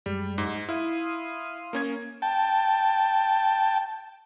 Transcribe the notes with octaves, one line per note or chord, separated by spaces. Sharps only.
F#2 G3 G#3
G#2
E4 F5 C6 D#6
A#3 C#4 G#6
G5 A5